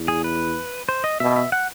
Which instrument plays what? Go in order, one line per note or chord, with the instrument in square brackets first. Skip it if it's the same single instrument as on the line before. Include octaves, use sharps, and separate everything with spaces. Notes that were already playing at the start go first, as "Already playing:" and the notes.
Already playing: [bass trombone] E2
[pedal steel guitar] G#4
B4
C5
D#5
[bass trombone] B2 [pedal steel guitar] E5
[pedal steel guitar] E5
F#5